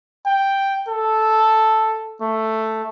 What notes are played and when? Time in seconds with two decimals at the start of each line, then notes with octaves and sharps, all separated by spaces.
0.26 G5
0.88 A4
2.22 A3